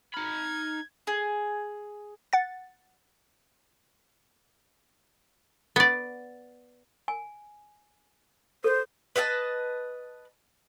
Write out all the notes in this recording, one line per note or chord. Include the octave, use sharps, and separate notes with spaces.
D#4 B5 F6 G#6
G#4
F#5 A6
B3 D5
G#5
A4 C5
B4 D#5 F5 A5